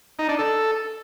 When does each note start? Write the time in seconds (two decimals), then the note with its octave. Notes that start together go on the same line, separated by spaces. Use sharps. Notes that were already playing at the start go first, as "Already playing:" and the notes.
0.19 D#4
0.29 D4
0.39 A4